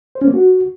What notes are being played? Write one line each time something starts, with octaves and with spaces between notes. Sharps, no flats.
C5
C#4
A#3
F#4